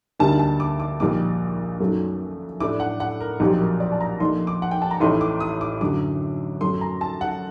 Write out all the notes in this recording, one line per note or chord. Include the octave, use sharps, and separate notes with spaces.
D2 D3 G3 A#3 D#4 A5
A5
D6
D6
A#1 A#2 G3 A#3 D#4 D6
F#2 D#3 F#3 A3
A2 A3 D4 D6
F#5
F#5
A#4
A#1 A#2 F#3 C4 D#4 G4
A#4
D5
A5
A#5
A#1 A#2 A3 D#4 C6
D6
F#5
G5
A5
A#5
A1 A2 A3 D#4 C6
D6
D#6
D6
F#2 D3 F#3 D6
F#2 F#3 A3 C6
A#5
A5
F#5